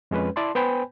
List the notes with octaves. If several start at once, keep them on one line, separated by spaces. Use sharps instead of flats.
F2 G#3 C#4 B4
E4 D5 A5 C6
B3 B4 C5 G5 G#5 B5